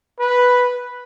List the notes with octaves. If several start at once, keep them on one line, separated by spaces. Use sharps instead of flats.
B4